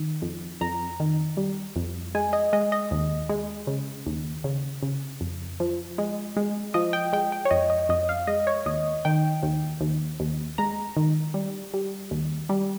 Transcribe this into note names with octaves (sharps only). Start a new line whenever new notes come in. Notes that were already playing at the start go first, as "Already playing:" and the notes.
Already playing: D#3
F2
F2 A#5
D#3
G3
F2
G#3 G#5
D#5
G#3 D#5
D#5
D#2
G#3
C#3
D#2
C#3
C#3
F2
F3
G#3
G#3
F3 D#5
G5
G#3 G5
G5
C#5
F2 D#5
D#5
F2 D#5
F5
G#3 D#5
C#5
D#2 D#5
D#3 G5
D#2
D#2
D#2
G#3 A#5
D#3
G3
G3
D#2
G3